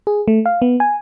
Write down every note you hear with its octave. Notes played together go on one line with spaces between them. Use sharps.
G#4
A3
F5
B3
G#5